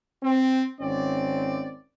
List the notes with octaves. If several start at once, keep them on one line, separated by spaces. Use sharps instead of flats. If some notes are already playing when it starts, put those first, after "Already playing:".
C4
G#1 C4 C#4 D5